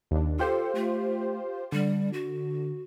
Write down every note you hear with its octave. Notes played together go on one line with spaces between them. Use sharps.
D#2 D4
F4 G4 A4 C5
A3
D3 G3
F#4